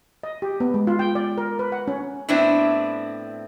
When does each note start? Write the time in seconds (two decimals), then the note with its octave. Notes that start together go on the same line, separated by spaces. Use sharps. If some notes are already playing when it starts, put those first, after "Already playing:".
0.23 D#5
0.42 G4
0.60 B3
0.74 G#3
0.87 F4
0.99 G5
1.15 D5
1.38 A#4
1.59 B4
1.72 F#5
1.88 C#4
2.29 A2 B3 C4 D4 E4